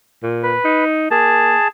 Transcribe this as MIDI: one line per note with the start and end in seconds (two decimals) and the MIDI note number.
0.23 0.53 46
0.43 0.84 71
0.65 1.07 63
1.11 1.55 58
1.11 1.68 68
1.11 1.68 81